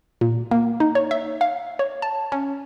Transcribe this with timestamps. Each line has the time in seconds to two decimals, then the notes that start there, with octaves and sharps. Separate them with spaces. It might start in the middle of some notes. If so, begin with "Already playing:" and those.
0.21 A#2
0.51 A#3
0.80 D#4
0.95 C#5
1.11 E5
1.41 F5
1.79 C#5
2.02 A5
2.32 C#4